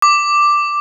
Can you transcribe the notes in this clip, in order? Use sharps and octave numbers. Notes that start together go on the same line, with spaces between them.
D6